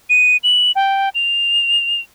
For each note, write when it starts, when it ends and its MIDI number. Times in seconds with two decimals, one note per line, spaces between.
0.09 0.37 99
0.43 0.72 102
0.75 1.09 79
1.15 2.00 101